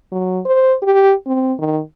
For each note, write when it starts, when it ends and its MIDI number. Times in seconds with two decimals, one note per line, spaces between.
0.12 0.40 54
0.45 0.75 72
0.83 1.14 67
1.26 1.53 60
1.59 1.80 51